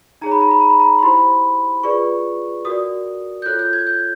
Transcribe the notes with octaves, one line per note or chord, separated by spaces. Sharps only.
D#4 G#4 C#5 A#5
B5
A#5
B5
A#5
B5
A#5
C6
E4 G4 C5 B5
F4 G#4 B4 D5 C#6
F#4 A#4 D5 D#6
G6
F4 A4 C#5 F#6
G6
G#6
G6